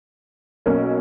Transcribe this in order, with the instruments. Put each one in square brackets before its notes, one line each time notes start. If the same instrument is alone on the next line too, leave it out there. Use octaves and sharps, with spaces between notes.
[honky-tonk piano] B1 B2 A#3 C#4